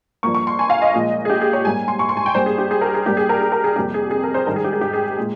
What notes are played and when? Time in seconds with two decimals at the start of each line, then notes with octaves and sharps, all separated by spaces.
0.23 G2 F3 A#3 C#6
0.34 C#6
0.47 C6
0.59 G#5
0.70 F5
0.82 D#5
0.94 A#2 F3 G#3
1.25 G#4
1.30 G4
1.41 G#4
1.53 C#5
1.65 G#2 G3 A#3 G#5
1.88 C6
1.99 C#6
2.09 C6
2.17 G#5
2.26 G5
2.34 G2 G3 A#3 C5
2.46 G#4
2.58 G4
2.71 G#4
2.81 A#4
2.94 G#4
3.05 G2 G3 A#3 G4
3.17 G#4
3.29 A#4
3.41 G#4
3.52 A#4
3.64 G#4
3.76 F2 C3 G3 A#3 G4
3.94 G#4
4.11 G#4
4.24 A#4
4.34 C5
4.47 G#2 D#3 G3 A#4
4.56 G#4
4.64 G4
4.73 G#4
4.81 G4
4.93 G#4
5.17 A#2 G#3